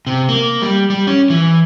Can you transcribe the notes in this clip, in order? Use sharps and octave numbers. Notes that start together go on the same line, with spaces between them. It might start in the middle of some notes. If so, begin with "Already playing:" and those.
C3
A#3
G3
G3
C#4
E3